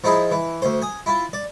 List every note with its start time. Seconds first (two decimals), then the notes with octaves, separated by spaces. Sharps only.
0.04 F3 D#4 E4 G#4
0.31 E3
0.62 D2 C5
0.82 G#5 D#6
1.06 E4 F4
1.33 D5